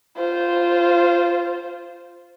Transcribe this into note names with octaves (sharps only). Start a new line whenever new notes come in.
F4 C5